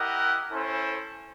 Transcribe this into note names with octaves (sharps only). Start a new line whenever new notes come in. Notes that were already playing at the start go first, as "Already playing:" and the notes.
Already playing: E4 G4 A#4 D#5 F#5
C#4 E4 A4 C5